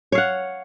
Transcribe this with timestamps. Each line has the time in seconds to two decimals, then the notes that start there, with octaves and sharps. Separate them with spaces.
0.12 C#5
0.15 F5
0.18 F#5